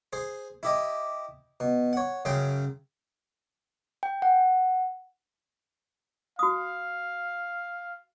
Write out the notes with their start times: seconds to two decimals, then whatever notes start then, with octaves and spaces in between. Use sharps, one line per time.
0.13 G#4 C5
0.63 E4 G4 D#5
1.60 B2
1.93 C#5 F#5
2.25 F#2 C#3 G#4 G5 C6
4.03 G5
4.22 F#5
6.39 F#4 F5 D#6